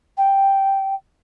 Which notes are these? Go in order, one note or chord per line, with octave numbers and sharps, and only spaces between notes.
G5